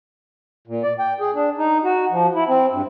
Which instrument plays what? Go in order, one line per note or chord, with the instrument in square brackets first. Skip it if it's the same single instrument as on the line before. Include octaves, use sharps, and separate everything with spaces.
[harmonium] A#2
D5
G5
G#4
D4
D#4
F#4
F3
E4
C4
G2